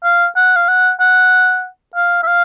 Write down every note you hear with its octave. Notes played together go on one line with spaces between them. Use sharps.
F5
F#5
F5
F#5
F#5
F5
E5
F5